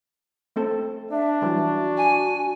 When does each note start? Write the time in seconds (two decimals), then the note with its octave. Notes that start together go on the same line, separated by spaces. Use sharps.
0.56 A3 C4 A4
1.12 D4 E5
1.42 E3 F#3 G3 F#4
1.97 G#5